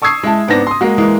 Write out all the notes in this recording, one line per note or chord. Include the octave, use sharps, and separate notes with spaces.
A5 C#6 D#6 E6 G#6 C7
G#3 E4 A5
G#2 B3 C4 D4 A#6
C6 D#6
G#3 A#3 F#4
E3 G#3 A#3